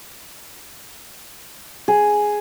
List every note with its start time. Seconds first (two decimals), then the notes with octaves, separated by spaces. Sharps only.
1.88 G#4